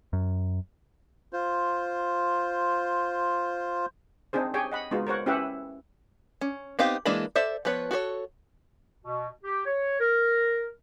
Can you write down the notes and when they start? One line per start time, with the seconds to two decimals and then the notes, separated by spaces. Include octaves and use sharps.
0.13 F#2
1.33 F4 C5
4.33 C4 D4 D#4 G#4 C5
4.54 G4 G#4 C#5 G5 G#5
4.72 D#5 F#5 B5
4.91 G#3 B3 D#4 F4 F#4
5.07 A#4 C5 C#5 F#5
5.26 C#4 E4 G4 B4 E5 F#5
6.41 C#4
6.79 B3 C4 D#4 G4 F5
7.05 E3 G#3 A#3 D4 B5
7.36 A4 C5 D5 E5
7.65 F3 B3 B4 C#5
7.91 F#4 A4 B4 C#5
9.03 B2
9.44 G4
9.66 C#5
10.00 A#4